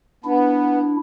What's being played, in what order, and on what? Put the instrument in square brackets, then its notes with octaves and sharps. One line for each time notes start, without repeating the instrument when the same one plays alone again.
[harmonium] B3 [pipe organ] D4 E4